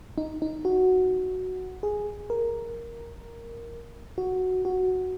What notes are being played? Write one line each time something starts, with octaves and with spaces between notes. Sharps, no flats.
D#4
D#4
F#4
G#4
A#4
F#4
F#4